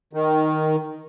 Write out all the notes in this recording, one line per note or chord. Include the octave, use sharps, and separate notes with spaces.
D#3